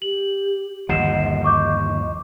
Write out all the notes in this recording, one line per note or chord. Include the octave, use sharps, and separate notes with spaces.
G4 F#7
G1 D#2 F3 D#5 F#5 C7 E7
D#5 C#6 D6 G6